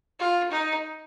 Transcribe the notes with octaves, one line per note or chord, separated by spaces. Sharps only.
F4
D#4